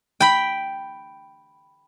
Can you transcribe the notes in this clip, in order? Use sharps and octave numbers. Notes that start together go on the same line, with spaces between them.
G5 B5